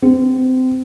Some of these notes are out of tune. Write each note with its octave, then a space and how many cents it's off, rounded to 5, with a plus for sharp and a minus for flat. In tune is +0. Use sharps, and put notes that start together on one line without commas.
C4 -25